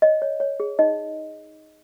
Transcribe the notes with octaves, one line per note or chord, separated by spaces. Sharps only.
C#5 D#5
C#5
C#5
G#4
D#4 D#5